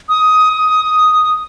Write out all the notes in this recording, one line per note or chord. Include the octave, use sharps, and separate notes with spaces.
D#6
D#6